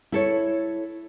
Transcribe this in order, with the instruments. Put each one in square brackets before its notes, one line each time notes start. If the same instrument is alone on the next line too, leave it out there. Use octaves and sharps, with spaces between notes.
[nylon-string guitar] E4 A4 C#5